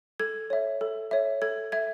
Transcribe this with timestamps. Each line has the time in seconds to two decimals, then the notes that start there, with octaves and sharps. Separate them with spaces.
0.20 A4 G#6
0.50 C#5 E5
0.81 A4
1.11 C#5 E5
1.42 A4 G#6
1.72 E5 G#6